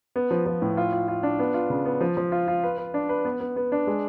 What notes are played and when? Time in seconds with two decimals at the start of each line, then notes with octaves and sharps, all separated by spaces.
0.16 B3
0.31 F3
0.46 F3
0.62 A2
0.77 F4
0.93 F4
1.08 F4
1.23 D4
1.39 B3
1.54 F4
1.70 C#3
1.85 B3
2.01 F3
2.17 F3
2.32 F4
2.48 F4
2.64 B4
2.78 B4
2.94 D4
3.09 B4
3.25 B3
3.40 B3
3.56 B3
3.72 D4
3.87 G#3